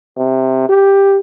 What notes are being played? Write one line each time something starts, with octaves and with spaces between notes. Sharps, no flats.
C3
G4